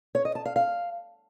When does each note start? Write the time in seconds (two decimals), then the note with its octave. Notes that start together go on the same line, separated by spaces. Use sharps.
0.15 C#5
0.25 D#5
0.35 A5
0.45 F5
0.56 F5